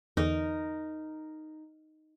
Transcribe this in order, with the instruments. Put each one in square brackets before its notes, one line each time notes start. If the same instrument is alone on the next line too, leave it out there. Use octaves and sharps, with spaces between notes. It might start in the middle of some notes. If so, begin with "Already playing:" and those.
[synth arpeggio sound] E2 D3 E3 [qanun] D#4 A#4